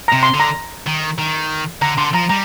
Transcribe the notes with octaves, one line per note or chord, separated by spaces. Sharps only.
C3 A#5
C6
D3
A#5
D#3
D#3
D3 A#5
D3 C6
F3 A#5
G3 A#5